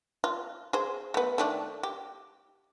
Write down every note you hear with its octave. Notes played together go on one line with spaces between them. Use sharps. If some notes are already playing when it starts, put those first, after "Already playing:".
F4
G#4 C5
A3 B3
D#3 A3 D4
G4